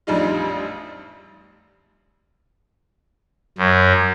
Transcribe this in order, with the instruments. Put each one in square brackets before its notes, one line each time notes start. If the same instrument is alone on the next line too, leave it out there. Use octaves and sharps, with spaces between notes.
[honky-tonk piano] A1 F2 G3 D4 D#4 F4
[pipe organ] F#2